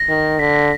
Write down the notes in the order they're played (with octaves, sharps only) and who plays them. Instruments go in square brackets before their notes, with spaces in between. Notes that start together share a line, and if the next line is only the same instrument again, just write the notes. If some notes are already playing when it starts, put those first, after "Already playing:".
Already playing: [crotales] A#6
[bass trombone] D#3
[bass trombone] D3 [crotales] B6
[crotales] A#6